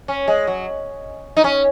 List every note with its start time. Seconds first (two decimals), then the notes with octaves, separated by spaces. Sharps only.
0.08 C#4
0.28 G#3
0.47 F#3
1.37 D#4
1.44 C#4